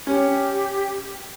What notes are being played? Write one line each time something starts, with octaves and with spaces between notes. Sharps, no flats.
C#4 G4